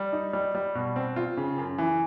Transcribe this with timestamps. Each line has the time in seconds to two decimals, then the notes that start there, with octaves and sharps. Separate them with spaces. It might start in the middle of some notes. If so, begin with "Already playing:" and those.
Already playing: G3
0.13 D#4
0.33 G3
0.55 G3
0.75 B2
0.96 C4
1.16 F4
1.37 C#3
1.58 F#2
1.78 E3